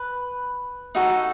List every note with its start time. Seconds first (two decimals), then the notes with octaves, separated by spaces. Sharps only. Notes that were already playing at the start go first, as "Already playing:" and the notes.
Already playing: B4
0.95 D#4 F#4 A4